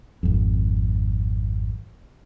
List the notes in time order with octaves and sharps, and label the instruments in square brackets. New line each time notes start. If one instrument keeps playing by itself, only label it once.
[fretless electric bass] G#1 F2